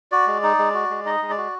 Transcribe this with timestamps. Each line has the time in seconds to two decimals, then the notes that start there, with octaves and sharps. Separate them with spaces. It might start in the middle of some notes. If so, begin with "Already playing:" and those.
0.12 F#4 D5
0.27 G#3
0.43 D#4
0.59 G#3
0.74 F#4
0.90 G#3
1.06 D#4 D#5
1.22 G#3
1.30 D5
1.37 F#4